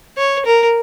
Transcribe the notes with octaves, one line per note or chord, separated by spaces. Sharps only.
C#5
A#4